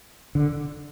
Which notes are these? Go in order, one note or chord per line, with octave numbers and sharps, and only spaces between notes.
D3